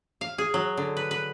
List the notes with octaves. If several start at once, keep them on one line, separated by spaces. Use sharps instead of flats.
F5
G#4
F#3
D3
B4
B4